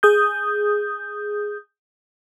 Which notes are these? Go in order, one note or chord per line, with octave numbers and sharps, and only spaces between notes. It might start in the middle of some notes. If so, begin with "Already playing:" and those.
G#4 D#6 G6